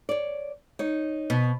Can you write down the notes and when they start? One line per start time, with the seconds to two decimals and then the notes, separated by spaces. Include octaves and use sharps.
0.09 C#5 D5
0.79 D#4 C#5
1.30 B2